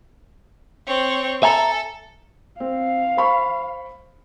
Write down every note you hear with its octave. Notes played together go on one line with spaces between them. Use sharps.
C4 C#5
A4 E5 G#5 A#5
C4 F5
C5 B5 C#6